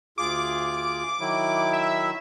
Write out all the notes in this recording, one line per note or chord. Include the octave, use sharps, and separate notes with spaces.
D2 F4 G#4 D6
D#3 F#3 E4
E5